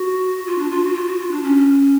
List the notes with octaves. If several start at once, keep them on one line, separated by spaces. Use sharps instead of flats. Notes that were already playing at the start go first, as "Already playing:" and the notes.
Already playing: F#4
F4
D4
F4
F#4
F4
F#4
F4
D4
C#4